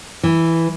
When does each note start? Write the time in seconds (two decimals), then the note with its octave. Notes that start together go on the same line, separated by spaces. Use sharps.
0.23 E3